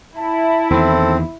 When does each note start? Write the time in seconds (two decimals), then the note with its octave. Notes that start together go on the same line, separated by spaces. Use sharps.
0.18 E4 A5
0.70 E2 D#3 C4 A4